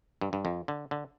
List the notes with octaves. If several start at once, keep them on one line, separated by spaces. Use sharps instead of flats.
G2
G2
F2
D3
D3